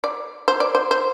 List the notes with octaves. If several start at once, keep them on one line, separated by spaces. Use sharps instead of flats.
D5
C5
D5
C5
C5